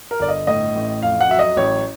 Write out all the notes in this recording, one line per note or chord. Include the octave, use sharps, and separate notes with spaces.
A#4
G1 D5
D#5
A2 D#5
A1
F2 F5
F#5
F#3 E5
D#5
A1 C#5